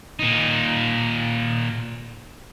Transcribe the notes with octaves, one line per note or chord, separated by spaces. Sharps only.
A#2 D#4